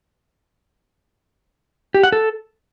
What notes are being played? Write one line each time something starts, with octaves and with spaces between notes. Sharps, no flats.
G4
F#5
A4